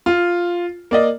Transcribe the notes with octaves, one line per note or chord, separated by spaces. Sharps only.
F4
A#3 D5 D#5